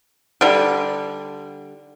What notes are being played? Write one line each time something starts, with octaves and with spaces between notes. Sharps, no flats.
D3 G3